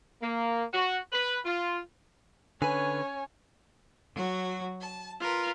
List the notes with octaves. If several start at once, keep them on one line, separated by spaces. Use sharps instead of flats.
A#3
F#4
B4
F4
D3 C#4 B4 C#5 G#5
F#3 F#4
A5
F4 A#4 B4